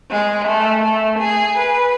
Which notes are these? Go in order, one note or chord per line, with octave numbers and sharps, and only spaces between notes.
G#3
A3
A3
G#4
B4